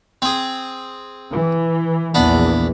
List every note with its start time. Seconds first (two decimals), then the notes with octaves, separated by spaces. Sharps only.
0.22 C4 G#4
1.30 E3
2.15 A#1 E2 E3 B3 D4